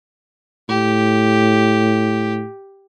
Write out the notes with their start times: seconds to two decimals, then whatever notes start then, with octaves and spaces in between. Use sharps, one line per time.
0.69 A2 G4